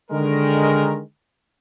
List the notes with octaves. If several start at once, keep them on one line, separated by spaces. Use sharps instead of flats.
D3 D#3 G#3 A#4